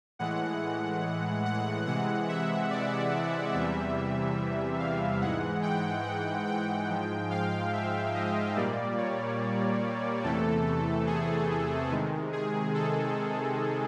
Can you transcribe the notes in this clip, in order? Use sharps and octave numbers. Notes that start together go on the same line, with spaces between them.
A2 E3 G#3 F#5
F#5
C3 E3 G#3 F#5
E5
D5
E2 C3 E3 G3 E5
F5
G#2 E3 G#3 F#5
G5
F#5
G5
G#2 F3 G#3
F5
E5
D#5
A#2 G3 A#3 D5
C#5
E2 C3 E3 A3 A4
G#4
C3 D#3 G#3
G#4
A4